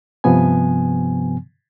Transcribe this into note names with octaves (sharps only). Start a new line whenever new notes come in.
G2 C3 F3 B3 G#5